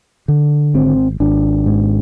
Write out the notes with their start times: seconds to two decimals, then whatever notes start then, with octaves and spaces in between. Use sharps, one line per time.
0.28 D3
0.74 G#1 C4
1.20 G#1 D4
1.66 G#2